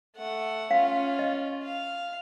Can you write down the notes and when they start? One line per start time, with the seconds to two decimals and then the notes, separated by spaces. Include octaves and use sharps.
0.16 A3 F#5
0.71 C#4 F4 F5
1.19 D#5
1.63 F5